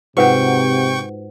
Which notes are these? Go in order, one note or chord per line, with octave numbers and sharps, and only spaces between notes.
G#2 C3 F4 F#4 B4 F#5 G5 C#6